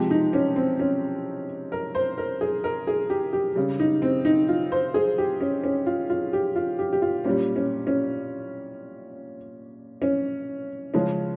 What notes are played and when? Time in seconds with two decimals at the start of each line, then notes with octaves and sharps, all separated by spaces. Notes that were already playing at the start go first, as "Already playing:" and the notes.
Already playing: C3 F3 G#3 G4
0.11 D#4
0.33 C#4
0.56 C4
0.79 C#4
1.72 A#4
1.95 C5
2.18 A#4
2.41 G#4
2.64 A#4
2.87 G#4
3.10 G4
3.33 G4
3.56 C#3 G3
3.80 D#4
4.02 C4
4.25 D#4
4.49 F4
4.72 C5
4.94 G#4
5.18 G4
5.41 C#4
5.64 C#4
5.86 F4
6.10 F4
6.33 G4
6.56 F4
6.79 G4
6.93 G4
7.02 F4
7.25 A#2 G3 C#4
7.56 C#4
7.87 C#4
10.02 C#4
10.94 C#3 F3 G#3 C#4